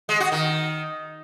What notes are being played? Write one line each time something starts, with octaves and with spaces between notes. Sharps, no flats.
G#3
F#4
D#3